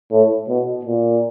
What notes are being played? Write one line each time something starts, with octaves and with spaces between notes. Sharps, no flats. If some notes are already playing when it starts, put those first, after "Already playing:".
A2
B2
A#2